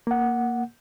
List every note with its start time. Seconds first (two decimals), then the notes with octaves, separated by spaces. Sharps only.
0.07 A#3 F#5